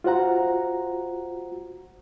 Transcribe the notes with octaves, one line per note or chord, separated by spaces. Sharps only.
F4 F#4 C5 F#5 A#5